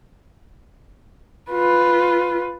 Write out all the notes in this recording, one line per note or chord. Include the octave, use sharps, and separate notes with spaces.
F4 B4